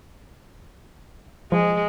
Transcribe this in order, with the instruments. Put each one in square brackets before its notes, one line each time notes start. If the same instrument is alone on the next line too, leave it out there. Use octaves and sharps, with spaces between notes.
[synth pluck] F3 [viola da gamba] G#3